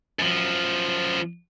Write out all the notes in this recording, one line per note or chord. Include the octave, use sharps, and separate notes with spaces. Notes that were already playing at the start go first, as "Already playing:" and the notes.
F#2 F3